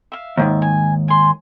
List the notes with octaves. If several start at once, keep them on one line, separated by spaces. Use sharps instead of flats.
E5 F5
D#2 G#2 D#3
G#5
G#5 C6